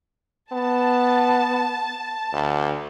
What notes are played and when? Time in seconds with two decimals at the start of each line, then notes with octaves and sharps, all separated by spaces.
0.52 B3 A5
2.33 D2